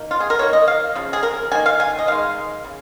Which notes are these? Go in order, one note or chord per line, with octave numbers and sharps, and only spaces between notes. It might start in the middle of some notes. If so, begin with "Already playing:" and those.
Already playing: D#3 A#3
F4
G#4
A#4
D#3 A#3 C#5
D#5
F5
C#3 F3
G#4
A#4
D#3 A#3 G#5
F5
G#5
D#5
D#3 G#3 F5
C#3